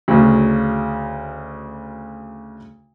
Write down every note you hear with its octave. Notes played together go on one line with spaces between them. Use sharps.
D2 C#3 F#3